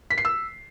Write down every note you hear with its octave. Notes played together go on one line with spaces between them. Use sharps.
B6
C7
E6